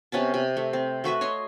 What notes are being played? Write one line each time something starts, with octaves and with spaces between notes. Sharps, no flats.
C3 B3 C#4 A5
C3
A3
C4
A3 F#4 B4 E5
C#5 D#5 C6